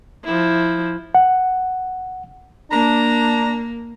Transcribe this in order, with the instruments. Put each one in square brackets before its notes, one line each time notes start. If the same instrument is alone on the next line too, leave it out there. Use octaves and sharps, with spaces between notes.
[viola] F3 E4
[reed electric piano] F#5
[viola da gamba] A#3 [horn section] D4 A#5